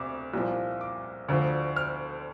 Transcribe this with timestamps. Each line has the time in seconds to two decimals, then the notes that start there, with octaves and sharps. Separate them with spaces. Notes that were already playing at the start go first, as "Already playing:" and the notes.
Already playing: D2 C3 D6
0.34 C2 A#2 F3
0.81 D6
1.28 D2 D3 F3
1.76 F6